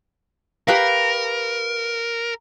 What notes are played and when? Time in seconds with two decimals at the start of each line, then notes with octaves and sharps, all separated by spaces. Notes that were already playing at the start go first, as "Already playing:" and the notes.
0.68 G4 A#4 B4 F5